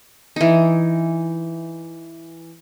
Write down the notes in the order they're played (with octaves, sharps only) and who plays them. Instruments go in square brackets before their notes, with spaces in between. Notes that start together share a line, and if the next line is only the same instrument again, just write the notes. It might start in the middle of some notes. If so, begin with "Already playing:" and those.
[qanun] E3 D#4